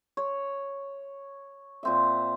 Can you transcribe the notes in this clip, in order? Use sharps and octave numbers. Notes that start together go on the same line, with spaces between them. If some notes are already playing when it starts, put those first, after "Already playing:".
C#5
A#2 C4 E5